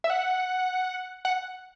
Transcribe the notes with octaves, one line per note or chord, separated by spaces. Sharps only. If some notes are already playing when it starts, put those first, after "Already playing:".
E5
F#5
F#5